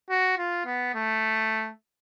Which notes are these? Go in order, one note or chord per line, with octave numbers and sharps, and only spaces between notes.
F#4
F4
B3
A3